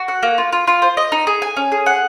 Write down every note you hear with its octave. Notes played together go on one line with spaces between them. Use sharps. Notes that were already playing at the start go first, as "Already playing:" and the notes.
Already playing: F#4
F#5
A#3
F4
F4
F4
C5
D#5
D#4
G#4
G#5
C#4
G#4
F#5